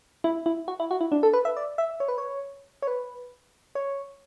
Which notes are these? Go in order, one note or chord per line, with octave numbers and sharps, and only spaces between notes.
E4
E4
F#4
E4
F#4
E4
D4
A4
B4
E5
D5
E5
C#5
B4
C#5
C#5
B4
C#5